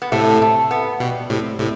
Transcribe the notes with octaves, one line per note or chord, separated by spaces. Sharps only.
B3
A2 C3 A3
A3
B3
B2 G3
A2 C3
A2 C3